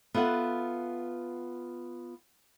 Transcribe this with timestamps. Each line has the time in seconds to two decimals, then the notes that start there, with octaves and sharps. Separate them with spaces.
0.14 B3 F4 A4 E5 F#5